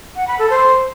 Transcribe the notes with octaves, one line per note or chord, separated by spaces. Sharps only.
F#5
B5
A4
C5